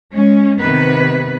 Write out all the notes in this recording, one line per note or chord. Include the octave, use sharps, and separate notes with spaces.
G#3 C#4
C3 D#3 B3 B4